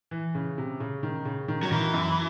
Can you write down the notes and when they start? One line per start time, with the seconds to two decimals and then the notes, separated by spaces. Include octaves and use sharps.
0.11 E3
0.35 C#3
0.58 C3
0.80 C#3
1.03 D#3
1.25 C#3
1.48 D#3
1.63 F#3
1.71 D#3 E3
1.94 F#2